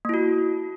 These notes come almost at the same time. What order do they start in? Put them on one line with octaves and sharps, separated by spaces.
A#3 E4 F#4